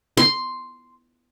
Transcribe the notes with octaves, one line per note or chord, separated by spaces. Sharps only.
C6